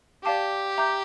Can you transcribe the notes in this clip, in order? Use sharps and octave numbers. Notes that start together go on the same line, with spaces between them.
G4 D5 F5 A5 D6
E5 A#5 D6 G6